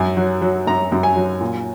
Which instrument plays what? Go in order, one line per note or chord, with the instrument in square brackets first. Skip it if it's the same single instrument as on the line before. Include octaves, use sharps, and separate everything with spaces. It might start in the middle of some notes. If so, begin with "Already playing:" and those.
Already playing: [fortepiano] F#2 G#5
F#3
F#3
F#2 A#5
F#2
G#5
F#3
A#2